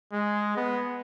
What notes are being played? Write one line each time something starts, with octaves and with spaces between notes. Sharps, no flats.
G#3
B3